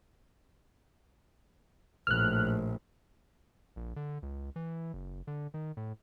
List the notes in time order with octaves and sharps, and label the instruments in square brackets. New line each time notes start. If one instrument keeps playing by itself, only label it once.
[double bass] A#1 A2 [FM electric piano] F6 F#6
[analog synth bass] A#1
D3
C#2
E3
F#1
D3
D#3
A2